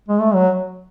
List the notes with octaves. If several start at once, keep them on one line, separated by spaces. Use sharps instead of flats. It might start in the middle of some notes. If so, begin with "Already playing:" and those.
G#3
A3
F#3